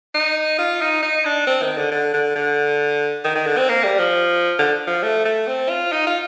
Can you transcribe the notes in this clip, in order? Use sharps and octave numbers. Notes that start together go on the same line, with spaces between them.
D#4
F4
D#4
D#4
D4
C4
D#3
D3
D3
D3
D3
D#3
D#3
D3
C4
A#3
G3
F3
D3
F3
A3
A3
C4
F4
D#4
F4